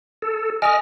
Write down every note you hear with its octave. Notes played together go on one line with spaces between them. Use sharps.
A4
D#5 G#5 D#6 F6